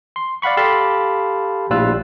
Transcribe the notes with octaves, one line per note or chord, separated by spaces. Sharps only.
C6
D5 F5 F#5 B5 C#6
G4 A4 F5 A5 B5 C6
A#1 A2 G3 F4 E6 F#6